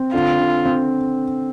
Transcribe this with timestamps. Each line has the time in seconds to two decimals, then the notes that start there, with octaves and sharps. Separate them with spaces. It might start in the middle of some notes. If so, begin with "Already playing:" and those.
Already playing: C4
0.13 D3 F4
0.39 D3
0.66 C4